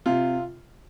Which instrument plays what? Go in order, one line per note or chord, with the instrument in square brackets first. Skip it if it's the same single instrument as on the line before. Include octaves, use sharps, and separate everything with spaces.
[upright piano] C3 F4